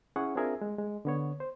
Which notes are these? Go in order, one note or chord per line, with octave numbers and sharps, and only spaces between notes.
C#4 E4 G#4 F#5 C#6
C4 D4 F4 G#4 A#4 E5
G#3
G#3
D3 B3 C#5
C5